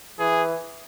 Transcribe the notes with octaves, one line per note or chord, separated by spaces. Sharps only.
E3 G#4